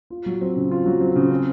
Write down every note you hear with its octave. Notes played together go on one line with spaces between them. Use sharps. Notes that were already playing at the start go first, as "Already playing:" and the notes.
F4
F#3
C4
C#3
F4
F#3
C4
C#3
C4